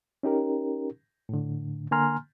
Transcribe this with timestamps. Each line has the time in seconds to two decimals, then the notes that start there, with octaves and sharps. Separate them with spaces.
0.23 C#4 D#4 G4 A#4
1.29 A2 D3
1.92 D3 A#3 G#5 A#5 C6 F6